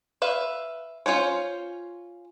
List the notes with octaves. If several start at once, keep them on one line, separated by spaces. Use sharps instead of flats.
B4 E5 F5
C#4 F4 C5 C#5